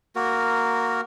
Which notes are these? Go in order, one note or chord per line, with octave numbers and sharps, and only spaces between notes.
A#3 F#4 A#4